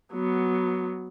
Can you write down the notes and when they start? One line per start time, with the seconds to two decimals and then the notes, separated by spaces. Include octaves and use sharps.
0.13 F#3 B3